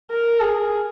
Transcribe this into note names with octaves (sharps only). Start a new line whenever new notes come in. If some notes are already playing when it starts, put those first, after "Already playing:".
A#4
G#4